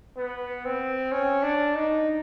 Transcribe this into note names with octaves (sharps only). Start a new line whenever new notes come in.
B3
C4
C#4
D4
D#4